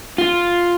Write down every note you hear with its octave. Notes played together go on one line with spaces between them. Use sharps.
F4